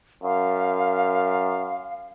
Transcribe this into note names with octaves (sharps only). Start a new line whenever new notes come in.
F#2 F5